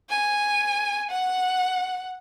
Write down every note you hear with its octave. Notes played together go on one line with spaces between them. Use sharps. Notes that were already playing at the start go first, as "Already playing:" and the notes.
G#5
F#5